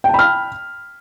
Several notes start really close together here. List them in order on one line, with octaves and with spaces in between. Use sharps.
G5 A5 B5 F6